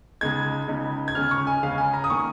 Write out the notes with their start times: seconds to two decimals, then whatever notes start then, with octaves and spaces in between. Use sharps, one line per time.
0.21 C#2 C#3 G#3 D#4 G#6
0.68 C#2 C#3 G#3 D#4
1.08 G#6
1.15 C#2 C#3 G#3 C#4 F6
1.31 C#6
1.47 G#5
1.63 C#2 C#3 G#3 C#4 F5
1.78 G#5
1.94 A#5
2.04 D#6
2.10 D#3 A#3 C#4 C#6